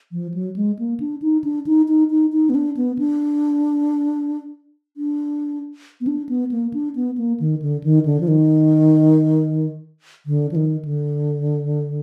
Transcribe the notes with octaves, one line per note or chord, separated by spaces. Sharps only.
F3
F#3
G#3
A#3
D4
D#4
D4
D#4
D#4
D#4
D#4
B3
D4
B3
D4
D4
B3
D4
B3
A#3
D4
B3
A#3
D#3
D3
D#3
D3
F3
D#3
D3
F3
D#3
D3